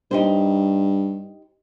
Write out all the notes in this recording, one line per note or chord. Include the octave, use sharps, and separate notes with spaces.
G2 D#4 G4 C5